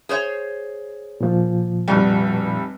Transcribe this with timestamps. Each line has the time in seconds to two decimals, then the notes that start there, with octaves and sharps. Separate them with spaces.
0.09 G#4 C5 C#5
1.21 A#2 F3
1.88 F1 B2 G3